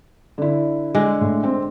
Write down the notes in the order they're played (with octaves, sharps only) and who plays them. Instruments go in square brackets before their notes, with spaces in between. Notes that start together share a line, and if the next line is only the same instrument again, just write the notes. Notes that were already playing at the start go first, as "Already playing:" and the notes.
[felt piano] D3 E4
[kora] D3 G#3
[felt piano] A2
C4